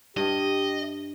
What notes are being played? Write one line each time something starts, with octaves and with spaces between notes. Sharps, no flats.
G2 G4 D#5